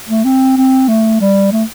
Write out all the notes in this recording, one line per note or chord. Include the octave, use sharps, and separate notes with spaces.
A3
C4
C4
A3
G3
A3